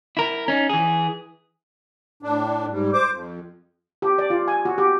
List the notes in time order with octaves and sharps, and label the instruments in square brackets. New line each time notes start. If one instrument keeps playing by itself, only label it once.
[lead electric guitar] E4 A#4
C#4 D#4
E3 G#4
[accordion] A2 D4
G#2 G3
C5 D6
F2
[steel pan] G4
D5
F4
G#5
F#4
G4